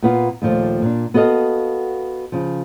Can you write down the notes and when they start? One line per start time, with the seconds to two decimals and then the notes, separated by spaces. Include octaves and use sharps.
0.03 A#2 B3 F4
0.42 D#2 A#2 F3 A3
0.82 A#2 D4
1.14 B3 F#4 A4 D#5 F5
2.32 C#3 F3